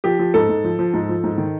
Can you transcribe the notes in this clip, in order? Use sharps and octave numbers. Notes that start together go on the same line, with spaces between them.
F3 G4
F3
G#2 A4
G#2
F3
F3
G#2
F3
G#2
D#3